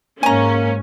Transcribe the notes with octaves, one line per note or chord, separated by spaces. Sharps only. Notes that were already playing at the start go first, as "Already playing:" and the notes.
G#2 A#3 C#4 G#5 A#5